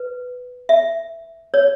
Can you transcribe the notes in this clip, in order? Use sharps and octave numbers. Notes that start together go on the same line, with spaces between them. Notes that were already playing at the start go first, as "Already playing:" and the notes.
Already playing: B4
E5
C#5